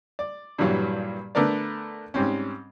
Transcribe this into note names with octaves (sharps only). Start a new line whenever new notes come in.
D5
G2 A#2 E3 F#3 G3
D3 A3 B3 A#4 B4 D5
G#2 G3 C4 C#4